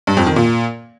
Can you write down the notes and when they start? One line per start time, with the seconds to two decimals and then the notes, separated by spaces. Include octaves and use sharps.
0.07 G2
0.17 F2
0.27 D#3
0.36 A#2